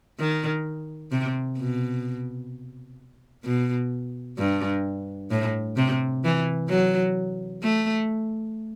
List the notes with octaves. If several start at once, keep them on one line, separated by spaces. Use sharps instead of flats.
D#3
C3
B2
B2
G2
A2
C3
E3
F#3
A3